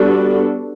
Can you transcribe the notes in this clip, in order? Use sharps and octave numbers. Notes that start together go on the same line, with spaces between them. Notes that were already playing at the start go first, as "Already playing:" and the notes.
Already playing: G3 B3 D4 F#4 A4